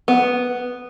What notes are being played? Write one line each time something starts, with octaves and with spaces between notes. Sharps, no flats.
B3